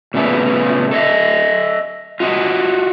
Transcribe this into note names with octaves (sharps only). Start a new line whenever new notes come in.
A#2 C#3 A3 B3
A4 D#5 E5
F4 F#4 D#5